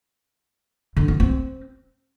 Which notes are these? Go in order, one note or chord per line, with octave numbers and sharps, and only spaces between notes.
D3
C#4
C4